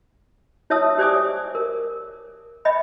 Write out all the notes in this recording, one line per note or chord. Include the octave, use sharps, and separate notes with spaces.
E4 C#5 E5 A5 D#6 E6
G4 C5 D5 G#5 D6 D#6
A#4
D#5 E5 G5 B5